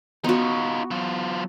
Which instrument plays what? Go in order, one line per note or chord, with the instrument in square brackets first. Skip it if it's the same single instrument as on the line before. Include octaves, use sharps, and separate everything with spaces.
[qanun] B3 F#4 [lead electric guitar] D#4 F4
[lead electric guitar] F#3 F4